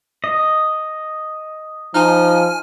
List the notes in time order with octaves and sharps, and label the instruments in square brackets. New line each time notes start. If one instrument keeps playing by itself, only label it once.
[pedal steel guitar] D#5
[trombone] F3 [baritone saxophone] D#4 [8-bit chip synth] G#5 F6